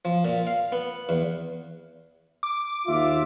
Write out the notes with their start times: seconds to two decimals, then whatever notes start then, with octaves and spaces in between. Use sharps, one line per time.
0.05 F3
0.25 A#2
0.47 F5
0.72 B3
1.09 E2
2.43 D6
2.87 D#2 F4 E5